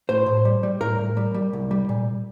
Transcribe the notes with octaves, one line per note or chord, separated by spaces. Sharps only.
A2 C5
A2
G3
G3
A2 A#4
A2
G3
G3
C2
G3
A#2